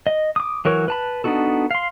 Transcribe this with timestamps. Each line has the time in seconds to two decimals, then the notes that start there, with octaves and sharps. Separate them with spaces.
0.07 D#5
0.36 D6 D#6
0.65 E3 F#3 A#4 C#5
0.88 B4 A5 B5
1.24 B3 D4 D#4 F#4 A4
1.71 F5 C6